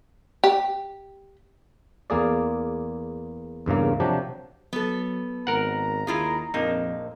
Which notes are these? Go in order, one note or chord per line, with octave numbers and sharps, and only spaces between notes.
G4
E2 A#3 G#4 D5
E2 G2 C#3 A#3
C3 F3 F#3 D4 G4
F#3 B3 A4
G#1 A#4 F#5 A#5
D#2 E4 F4 G#4
A#1 F2 A#3 C4 D#4